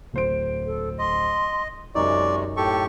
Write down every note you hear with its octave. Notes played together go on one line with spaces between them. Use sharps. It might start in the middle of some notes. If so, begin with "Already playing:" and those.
D1 C5 D7
A4
D#5 C6
F#2 C3 G#3 D#4 D5 C#6
A2 G4 A4 G5 C#6